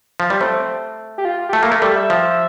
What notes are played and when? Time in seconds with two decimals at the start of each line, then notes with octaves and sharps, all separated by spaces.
0.20 F3
0.30 G3
0.41 A3 C4
1.18 G4
1.25 F4
1.49 G4
1.53 A3 A4
1.63 A#3
1.68 A3 A#4
1.82 G3 A4
1.96 E5
2.10 F3